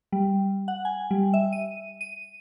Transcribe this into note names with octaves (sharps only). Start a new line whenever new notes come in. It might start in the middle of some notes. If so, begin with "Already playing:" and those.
G3
F#5
G#5
G3
E5
D#7
D#7